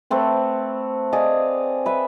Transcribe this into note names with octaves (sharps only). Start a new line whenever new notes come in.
A3 C4 B4
G#4 D5 D#5 F5
B4 E5